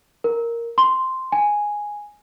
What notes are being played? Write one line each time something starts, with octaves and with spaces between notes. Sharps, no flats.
A#4
C6
G#5